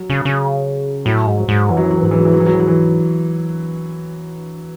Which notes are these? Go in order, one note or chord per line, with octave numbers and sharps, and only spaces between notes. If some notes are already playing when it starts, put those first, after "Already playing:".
Already playing: F#3
C#3
C#3
A2 F#3
G#2
F#3
G#2
F#2 E3
F#3
E3
F#3
E3
G#2 F#3
E3
F#3
E3
F#3
E3
F#3
E3
F#3
E3